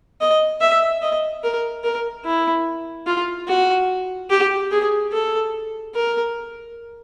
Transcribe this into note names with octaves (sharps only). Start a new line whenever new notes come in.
D#5
E5
D#5
A#4
A#4
E4
F4
F#4
G4
G#4
A4
A#4